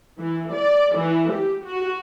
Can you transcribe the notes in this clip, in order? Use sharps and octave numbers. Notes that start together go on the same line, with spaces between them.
E3
D5
E3
G4
F#4